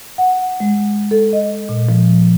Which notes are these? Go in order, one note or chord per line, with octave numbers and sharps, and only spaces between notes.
F#5
G#3
A4
D#5
A#2
F3